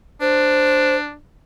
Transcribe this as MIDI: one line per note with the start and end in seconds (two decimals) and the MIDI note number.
0.21 1.16 62
0.21 0.96 72